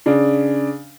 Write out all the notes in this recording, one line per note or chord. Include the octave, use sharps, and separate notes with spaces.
C#3 D4